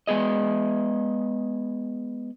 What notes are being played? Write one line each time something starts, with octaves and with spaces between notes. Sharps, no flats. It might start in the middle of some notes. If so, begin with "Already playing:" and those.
G#3 B3 G#4 D#5